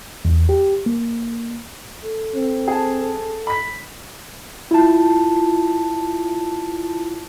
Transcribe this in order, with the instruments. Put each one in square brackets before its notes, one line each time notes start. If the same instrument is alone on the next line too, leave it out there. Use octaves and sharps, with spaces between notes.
[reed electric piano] E2
G4
A#3
[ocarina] A4
[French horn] C4
[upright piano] G#4 A5
B5 B6
[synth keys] E4 F4 A5